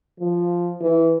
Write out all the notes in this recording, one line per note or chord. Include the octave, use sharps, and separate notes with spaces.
F3
E3